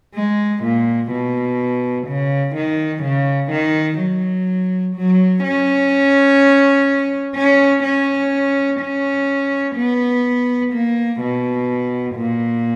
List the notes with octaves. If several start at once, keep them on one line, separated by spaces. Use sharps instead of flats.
G#3
A#2
B2
C#3
D#3
C#3
D#3
F#3
F#3
C#4
C#4
C#4
C#4
B3
A#3
B2
A#2